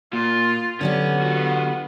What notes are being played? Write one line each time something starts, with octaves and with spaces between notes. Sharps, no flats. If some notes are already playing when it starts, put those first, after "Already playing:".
A#2 F4
D3 F#3 B3 C#4 G4
F4 F#4